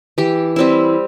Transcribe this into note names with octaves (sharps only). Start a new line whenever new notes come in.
E3 G4
G3 C4 E4